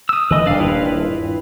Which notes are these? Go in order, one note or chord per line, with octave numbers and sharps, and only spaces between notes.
D#6 E6
D#3 E3 A3 B4 D#5
D#1 G2 D4 D5 F5
E4 F4 B4